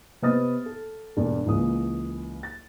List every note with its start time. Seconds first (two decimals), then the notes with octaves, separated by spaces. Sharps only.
0.22 C3 B3 D#5 D#6 F6 A6
0.66 A4
1.17 E1 G2 G4 D5
1.46 C#2 E3 A#3 D#6
2.43 A6